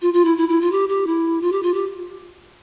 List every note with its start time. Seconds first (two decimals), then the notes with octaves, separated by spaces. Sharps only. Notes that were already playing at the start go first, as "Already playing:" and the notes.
0.02 F4
0.13 F4
0.25 E4
0.37 E4
0.49 E4
0.61 F4
0.72 G4
0.89 G4
1.07 E4
1.42 F4
1.52 G4
1.63 F4
1.74 G4